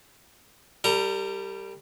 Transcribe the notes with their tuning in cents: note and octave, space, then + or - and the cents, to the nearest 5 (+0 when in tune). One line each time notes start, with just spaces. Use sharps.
G3 +0 A#4 -45 A#5 +10